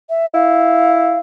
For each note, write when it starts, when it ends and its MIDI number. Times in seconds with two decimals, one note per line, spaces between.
0.10 0.26 76
0.34 1.21 64
0.34 1.19 77